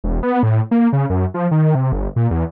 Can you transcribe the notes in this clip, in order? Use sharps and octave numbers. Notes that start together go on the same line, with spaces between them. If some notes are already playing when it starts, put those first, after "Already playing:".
E1
B3
A2
A#3
C#3
F#2
F3
D#3
C3
G1
A#2
E2